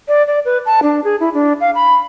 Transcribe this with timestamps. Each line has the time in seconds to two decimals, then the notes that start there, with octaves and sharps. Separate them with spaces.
0.08 D5
0.27 D5
0.45 B4
0.66 A5
0.83 D4
1.04 G#4
1.20 E4
1.34 D4
1.60 F5
1.75 B5